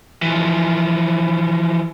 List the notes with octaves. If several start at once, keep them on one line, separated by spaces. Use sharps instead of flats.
E3 F3